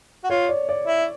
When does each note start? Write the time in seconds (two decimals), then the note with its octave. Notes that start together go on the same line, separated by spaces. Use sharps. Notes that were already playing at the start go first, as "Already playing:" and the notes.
0.24 F#4
0.30 F4 C#5
0.49 D5
0.69 D5
0.87 E4